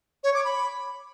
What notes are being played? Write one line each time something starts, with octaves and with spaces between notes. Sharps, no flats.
C#5
D6
B5